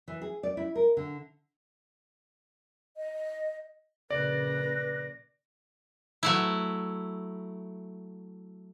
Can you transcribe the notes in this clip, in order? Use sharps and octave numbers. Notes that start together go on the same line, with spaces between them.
E3
G#4
D5
E4
A#4
D3
D#5
A#1 C#3 B4 D5 A#6
F#3 A3 E4